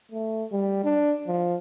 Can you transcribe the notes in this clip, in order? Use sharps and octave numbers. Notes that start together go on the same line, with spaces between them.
A3
G3
D4
F3